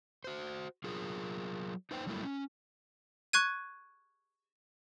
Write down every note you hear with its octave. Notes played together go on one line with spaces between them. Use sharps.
F#4 C5
F#3 F4 G#4 A#4
D#4 B4 C5 G5
F#3 G3 A3 A#3 E4
C#4
C#6 F#6 G#6 D#7